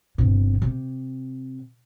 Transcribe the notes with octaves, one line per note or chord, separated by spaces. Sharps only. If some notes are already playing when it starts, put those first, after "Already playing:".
G1 C3
C3